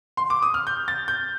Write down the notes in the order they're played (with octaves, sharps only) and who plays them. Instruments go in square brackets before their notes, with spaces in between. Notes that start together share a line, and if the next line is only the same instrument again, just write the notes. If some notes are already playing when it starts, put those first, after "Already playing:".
[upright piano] C6
D6
D#6
F6
G6
A6
G6